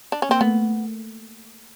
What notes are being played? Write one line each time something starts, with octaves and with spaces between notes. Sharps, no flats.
D4
C#4
A#3 C4
A3 B3